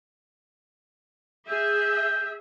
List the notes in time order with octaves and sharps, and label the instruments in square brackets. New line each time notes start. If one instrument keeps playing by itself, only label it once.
[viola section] G#4 E5 [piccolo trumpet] G6